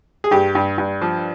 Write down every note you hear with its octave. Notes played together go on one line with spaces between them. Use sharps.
G#4
G2 G4
G2
G2
F3